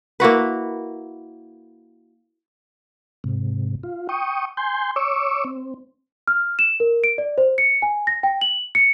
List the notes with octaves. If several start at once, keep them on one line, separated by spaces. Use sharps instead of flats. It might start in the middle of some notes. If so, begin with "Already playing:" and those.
A#3 E4 F#4 B4
G#2 C3
F4
G5 C#6 D#6
G#5 C6 G6
C#5 C#6 D6 E6
C4
F6
E7
A#4
D7
D5
C5
C#7
G#5
A#6
G5
F#7
C#7